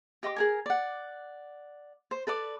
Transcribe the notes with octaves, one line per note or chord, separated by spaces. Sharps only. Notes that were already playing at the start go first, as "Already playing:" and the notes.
G4 D#5 C6 D6
G#4 A#4 G#5
D5 F#5
C5
A4 B4 D5 D6